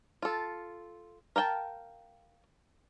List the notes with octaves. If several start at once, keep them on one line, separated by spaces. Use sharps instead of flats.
F4 A4
A#4 F5 G5 A5